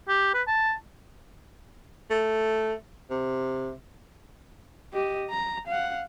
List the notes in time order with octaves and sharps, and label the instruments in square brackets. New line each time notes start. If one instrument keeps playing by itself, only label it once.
[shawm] G4
B4
A5
[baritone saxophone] A3
C3
[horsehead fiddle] G4 D#5
A#5
F5 F#5